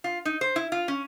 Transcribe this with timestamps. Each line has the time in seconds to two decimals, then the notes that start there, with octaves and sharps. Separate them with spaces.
0.04 F4
0.25 D#4
0.41 C5
0.56 E4
0.72 F4
0.88 C#4